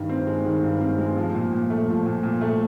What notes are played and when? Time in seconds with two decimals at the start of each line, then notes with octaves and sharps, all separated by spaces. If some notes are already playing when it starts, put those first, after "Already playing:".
Already playing: G2 D#3
0.09 C4
0.27 G#3
0.45 D#3
0.63 G2
0.81 C4
0.98 G#3
1.17 F3
1.34 A#2
1.53 A#2
1.70 A3
1.88 F3
2.06 A#2
2.23 A#2
2.41 A3